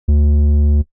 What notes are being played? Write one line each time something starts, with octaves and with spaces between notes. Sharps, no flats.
D2